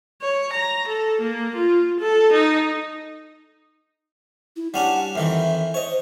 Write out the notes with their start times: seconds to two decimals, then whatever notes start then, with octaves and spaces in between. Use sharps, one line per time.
0.22 C#5
0.53 A#5
0.88 A4
1.21 A#3
1.55 F4
2.00 A4
2.33 D#4
4.56 E4
4.74 G3 C#4 D4 F#5
5.15 F2 D#3 E3 E5
5.74 C5 C#5 D#5